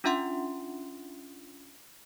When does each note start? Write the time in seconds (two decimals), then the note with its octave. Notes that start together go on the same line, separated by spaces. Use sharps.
0.04 C#4 D4 F4 E5 F#5 C6